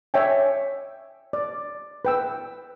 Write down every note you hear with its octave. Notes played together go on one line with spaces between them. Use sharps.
C#5 D5 E5 G5 G#5
D5
B4 G5 E6